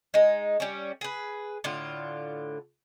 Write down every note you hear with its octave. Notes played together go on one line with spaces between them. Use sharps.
G#3 D#4
G3 C#4
G#4 B4
A2 D3 F4